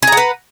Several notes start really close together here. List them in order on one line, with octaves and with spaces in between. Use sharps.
G#4 A#5 F#5 B4